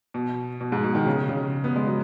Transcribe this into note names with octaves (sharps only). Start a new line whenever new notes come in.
B2
B2
G#2
B2
D#3
C#3
C#3
B3
G#3
F#3